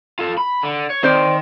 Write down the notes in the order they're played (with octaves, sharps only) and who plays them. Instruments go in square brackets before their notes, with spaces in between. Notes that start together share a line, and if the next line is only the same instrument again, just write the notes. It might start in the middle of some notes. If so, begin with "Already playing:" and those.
[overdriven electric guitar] F4 A4
B5
D3
C#5
[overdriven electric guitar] D#3 [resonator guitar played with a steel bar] C4 C5 D5